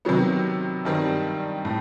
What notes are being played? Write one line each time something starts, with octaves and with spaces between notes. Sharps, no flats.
C3 D#3 F#3 B3
G2 D#3 G3 C4
A2